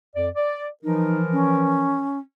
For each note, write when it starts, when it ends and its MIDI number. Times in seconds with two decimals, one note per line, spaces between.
0.15 0.27 41
0.15 0.27 74
0.35 0.66 74
0.83 2.11 52
0.83 2.11 53
0.83 1.19 63
0.83 2.11 70
1.32 2.19 61